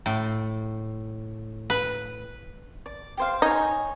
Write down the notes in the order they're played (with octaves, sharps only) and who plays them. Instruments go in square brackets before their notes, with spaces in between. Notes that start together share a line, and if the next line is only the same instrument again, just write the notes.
[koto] A2
B4
[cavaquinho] D5
G4 C5 F5
[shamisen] D#4 [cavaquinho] C#5 G#5